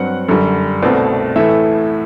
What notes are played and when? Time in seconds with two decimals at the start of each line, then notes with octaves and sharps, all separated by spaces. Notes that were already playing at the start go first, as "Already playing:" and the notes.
Already playing: G2 F#3 C4 F#5
0.28 F#2 D3 G3
0.82 C2 B2 A3 C4 D5
1.36 A2 E3 A3 E5